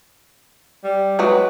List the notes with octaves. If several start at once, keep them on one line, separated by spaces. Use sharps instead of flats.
G3
F#3 G#3 B4